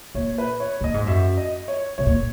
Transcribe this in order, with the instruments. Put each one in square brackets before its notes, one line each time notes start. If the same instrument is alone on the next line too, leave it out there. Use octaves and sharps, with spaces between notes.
[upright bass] A#2 [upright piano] C#5
[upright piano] B4
C#5
[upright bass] A#2 [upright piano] D#5
[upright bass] G#2
[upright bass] F#2 [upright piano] E5
[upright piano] D#5
C#5
[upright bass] B2 [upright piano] C#5
[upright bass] A#2